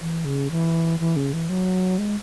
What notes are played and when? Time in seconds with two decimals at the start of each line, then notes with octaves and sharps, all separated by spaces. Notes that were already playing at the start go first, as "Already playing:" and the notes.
0.01 E3
0.25 C#3
0.51 E3
1.00 E3
1.16 C#3
1.33 E3
1.49 F#3
1.98 G#3